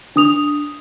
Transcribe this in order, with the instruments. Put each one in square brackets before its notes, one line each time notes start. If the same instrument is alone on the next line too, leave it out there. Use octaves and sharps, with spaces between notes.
[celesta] D4 D#6 F7